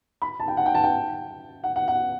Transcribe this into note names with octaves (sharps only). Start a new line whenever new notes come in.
B5
A5
G5
F#5
G5
A5
G5
F#5
F#5
F#5